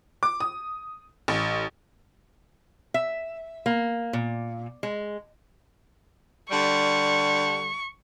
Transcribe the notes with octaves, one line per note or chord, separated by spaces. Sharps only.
D6
D#6
A1
E5
A#3
A#2
G#3
D3 G3 C#6